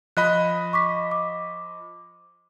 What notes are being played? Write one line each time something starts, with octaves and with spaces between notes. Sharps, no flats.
F3 D#5 B5 F#6
C#6 D6 B6
D6